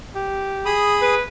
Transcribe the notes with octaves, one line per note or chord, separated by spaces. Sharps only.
G4
G#4 B5 D#6
B4